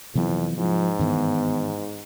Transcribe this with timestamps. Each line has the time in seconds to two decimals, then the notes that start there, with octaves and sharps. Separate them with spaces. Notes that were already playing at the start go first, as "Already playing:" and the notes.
0.15 F2 C3 E3 F#3 B3
0.57 G#2 F3
0.99 G2 D#3 E3 B3